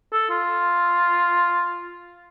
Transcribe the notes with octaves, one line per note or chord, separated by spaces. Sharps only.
A4
F4